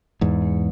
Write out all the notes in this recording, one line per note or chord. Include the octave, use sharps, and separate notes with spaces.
E2 G#2